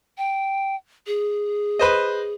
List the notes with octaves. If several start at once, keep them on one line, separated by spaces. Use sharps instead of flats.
G5
G#4
B4 C5 D#5